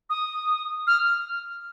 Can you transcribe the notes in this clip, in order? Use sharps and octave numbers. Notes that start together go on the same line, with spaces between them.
D#6
F6